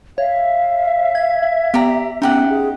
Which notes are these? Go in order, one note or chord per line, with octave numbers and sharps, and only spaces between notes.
C#5 E5 F5
G#6
B3 G4 D5 A#5
B3 C#4 D#4 G4 F#5
G#4